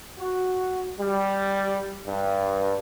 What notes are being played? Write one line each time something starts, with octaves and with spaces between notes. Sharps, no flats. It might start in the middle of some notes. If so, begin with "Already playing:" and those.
F#4
G3
G2